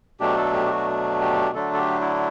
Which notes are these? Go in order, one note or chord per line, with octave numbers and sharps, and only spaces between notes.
B2 F#3 A3 D4 G4
A4
G4
G4
F#4
G4
D3 F#3 A3 D4 A4
A4
G4
E4